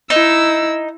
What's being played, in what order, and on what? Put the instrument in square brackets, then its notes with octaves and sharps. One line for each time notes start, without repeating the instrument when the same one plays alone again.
[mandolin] D#4 [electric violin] E4 E6